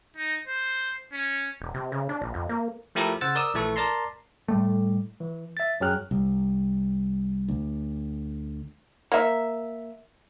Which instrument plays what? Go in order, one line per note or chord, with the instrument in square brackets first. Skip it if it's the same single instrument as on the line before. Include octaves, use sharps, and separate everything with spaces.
[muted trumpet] D#4
C5
C#4
[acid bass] E1
C3
C#3
D4
A#1
F2
A#3
[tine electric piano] F3 A3 E4 G4 A4 A#4
C#3 C5 F#5 E6 A6
A#4 D5 D#6 E6
A#1 E3 A3 A4 C#6
A#4 D5 A5 A#5 C6
[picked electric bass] A2 G3 A3
[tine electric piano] E3
E5 A6
F#2 F#3 G#4 G5 F6 F#6
[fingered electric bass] C2
D2
[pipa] A#3 E5